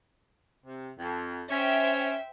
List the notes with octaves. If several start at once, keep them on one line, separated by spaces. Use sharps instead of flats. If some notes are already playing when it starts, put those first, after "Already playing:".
C3
F2
C#4 C5 E5 G5